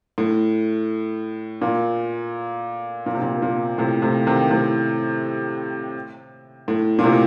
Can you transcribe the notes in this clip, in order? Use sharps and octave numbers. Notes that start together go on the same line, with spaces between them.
A2
A#2
A#2
C3
A#2
A#2
A2 C3
A2 C3
C3 D#3
A2 C3
A2
A#2
A2 C3